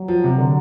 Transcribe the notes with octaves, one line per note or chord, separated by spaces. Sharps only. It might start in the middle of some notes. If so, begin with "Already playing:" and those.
Already playing: F#3
F3
C3
D3